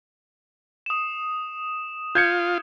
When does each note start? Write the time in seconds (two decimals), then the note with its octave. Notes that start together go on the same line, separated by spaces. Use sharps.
0.86 D#6 E7
2.15 F4 G6 G#6 C#7